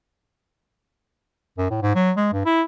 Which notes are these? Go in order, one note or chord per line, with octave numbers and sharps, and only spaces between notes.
F#2
A2
G#2
F#3
G#3
G2
E4